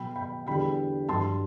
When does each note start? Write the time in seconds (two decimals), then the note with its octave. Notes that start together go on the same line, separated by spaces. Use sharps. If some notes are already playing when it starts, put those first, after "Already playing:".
Already playing: B2 F#3 G5 B5
0.16 G5 B5
0.46 E2 D3 G3 G5 B5
1.09 G2 F#3 A5 C6